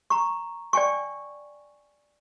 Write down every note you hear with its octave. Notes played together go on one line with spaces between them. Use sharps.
A#5 C#6
D5 G5 G#5 C#6